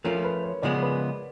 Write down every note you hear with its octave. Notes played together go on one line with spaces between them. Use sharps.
F3 A3 C#4 F4 A#4
B4
C#5
C#3 F3 G#3 B3 D5
B4